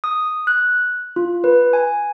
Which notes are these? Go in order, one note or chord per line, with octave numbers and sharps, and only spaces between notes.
D#6
F#6
F4
B4
G#5